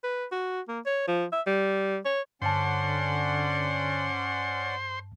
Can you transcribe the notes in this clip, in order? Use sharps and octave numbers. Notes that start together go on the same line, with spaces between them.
B4
F#4
A#3
C#5
F3
E5
G3
C#5
G2 D3 C#4 C5 D5 F#5 A5 C6